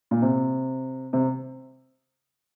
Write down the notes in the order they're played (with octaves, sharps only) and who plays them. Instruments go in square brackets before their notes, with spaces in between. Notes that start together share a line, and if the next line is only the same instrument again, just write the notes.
[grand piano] A#2
C3
C3